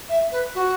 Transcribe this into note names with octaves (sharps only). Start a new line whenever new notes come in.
E5
B4
F#4